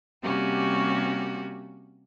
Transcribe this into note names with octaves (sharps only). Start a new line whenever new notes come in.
C3 G3 A#3 C#4 F#4 G4